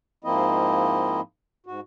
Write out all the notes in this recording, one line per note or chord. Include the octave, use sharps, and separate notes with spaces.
G#2 F3 A#3 C4 E4 D#5
G#2 F#4